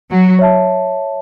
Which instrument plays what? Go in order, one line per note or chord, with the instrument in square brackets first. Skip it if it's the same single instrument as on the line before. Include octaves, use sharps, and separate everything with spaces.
[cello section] F#3
[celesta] C#5 E5 A5